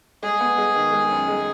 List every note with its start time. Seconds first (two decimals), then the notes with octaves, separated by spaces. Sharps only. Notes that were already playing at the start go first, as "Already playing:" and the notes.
0.23 G#3 G#4
0.40 B3
0.58 G#3
0.76 D#3
0.93 G#3
1.11 F#2
1.28 G#3